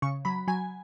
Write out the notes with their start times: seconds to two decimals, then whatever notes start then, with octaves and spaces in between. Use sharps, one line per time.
0.02 C#3 C#6
0.25 F#3 B5
0.47 F#3 G#5